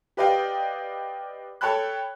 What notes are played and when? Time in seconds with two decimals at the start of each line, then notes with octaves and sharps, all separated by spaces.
0.17 G4 B4 D5 D#5 F5 G5
1.61 A4 C#5 G5 A5 B5 F#6